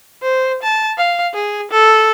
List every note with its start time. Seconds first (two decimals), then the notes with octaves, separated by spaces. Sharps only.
0.22 C5
0.63 A5
0.98 F5
1.34 G#4
1.71 A4